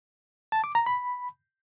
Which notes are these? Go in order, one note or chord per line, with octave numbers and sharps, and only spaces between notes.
A5
D6
A#5
B5